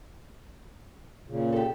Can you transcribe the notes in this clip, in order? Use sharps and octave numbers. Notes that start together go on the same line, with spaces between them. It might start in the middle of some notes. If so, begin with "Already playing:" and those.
A#2 C#3
G4 A4